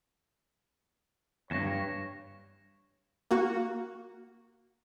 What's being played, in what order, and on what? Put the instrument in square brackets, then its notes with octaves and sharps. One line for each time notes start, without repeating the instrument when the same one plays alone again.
[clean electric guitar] E2 G2 [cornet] C#5 [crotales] A#6 E7
[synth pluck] A#3 F#4